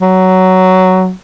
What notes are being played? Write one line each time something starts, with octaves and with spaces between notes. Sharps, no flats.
F#3